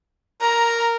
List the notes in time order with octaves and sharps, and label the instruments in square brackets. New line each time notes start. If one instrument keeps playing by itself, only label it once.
[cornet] A#4 [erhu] A#5